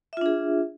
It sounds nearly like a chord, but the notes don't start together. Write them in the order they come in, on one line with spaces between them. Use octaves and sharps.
E5 F4 D4 G#4